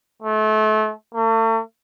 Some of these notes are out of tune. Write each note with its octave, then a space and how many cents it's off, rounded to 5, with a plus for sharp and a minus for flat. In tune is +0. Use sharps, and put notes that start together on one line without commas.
A3 -30
A3 +40